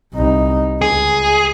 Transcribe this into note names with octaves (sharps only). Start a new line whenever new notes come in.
C2 D#4
C#2 G#4